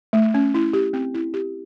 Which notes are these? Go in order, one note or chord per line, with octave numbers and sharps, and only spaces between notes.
A3
C#4
E4
G4
C4
E4
G4